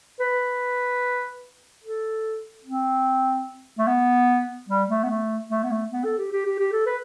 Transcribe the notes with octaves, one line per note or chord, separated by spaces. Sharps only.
B4
A4
C4
A3
B3
G3
A3
B3
A3
A3
B3
A3
B3
A4
G4
G4
G4
G4
A4
B4